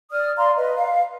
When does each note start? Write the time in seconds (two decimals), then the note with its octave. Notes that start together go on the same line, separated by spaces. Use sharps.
0.11 D5 D#6 F6
0.37 D5 F5 A#5 C6
0.56 B4 D#5
0.75 F5